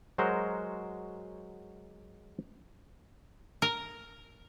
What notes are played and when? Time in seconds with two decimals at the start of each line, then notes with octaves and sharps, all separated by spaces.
0.18 F#3 G#3 F#4 A#4 C5
3.62 A#4